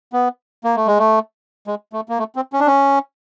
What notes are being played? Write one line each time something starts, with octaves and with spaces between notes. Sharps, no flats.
B3
A#3
A3
G#3
A3
G#3
A3
A#3
A3
C4
C#4
D4
C#4